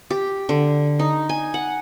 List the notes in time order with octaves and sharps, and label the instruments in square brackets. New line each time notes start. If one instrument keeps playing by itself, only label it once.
[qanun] G4
D3
D#4
G#5
F#5